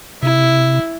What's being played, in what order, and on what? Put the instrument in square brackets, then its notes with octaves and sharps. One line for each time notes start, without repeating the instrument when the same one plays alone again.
[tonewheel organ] C3 [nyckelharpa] E4